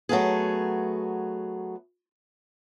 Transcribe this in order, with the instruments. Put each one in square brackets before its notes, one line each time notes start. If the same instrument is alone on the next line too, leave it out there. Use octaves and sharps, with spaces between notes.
[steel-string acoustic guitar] F#3 A3 B3 G#4